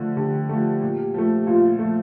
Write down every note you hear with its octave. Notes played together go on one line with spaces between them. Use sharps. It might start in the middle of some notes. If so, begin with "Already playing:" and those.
Already playing: D3 F3 A3
D3 G4
F3 A3
A#2
F3 A3
A#2 F4
F3 A3